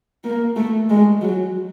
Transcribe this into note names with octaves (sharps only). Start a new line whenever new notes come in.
A#3
A3
G#3
F#3